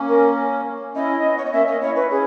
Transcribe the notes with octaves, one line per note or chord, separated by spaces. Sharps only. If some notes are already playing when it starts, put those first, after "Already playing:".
Already playing: A#3 C#4
A#4
C#4 E4 D#5
B3
C#5
D#5
A#3 C#4 E5
A#3 C#4 D#5
C#4 E4 C#5
B4
C#4 E4 G#4